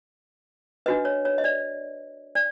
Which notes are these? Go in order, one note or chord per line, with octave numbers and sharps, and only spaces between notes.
D4 F#4 B4 D#5
C#5
C#5
D#5
D5
D5